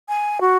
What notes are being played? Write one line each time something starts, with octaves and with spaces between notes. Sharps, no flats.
G#5
F#4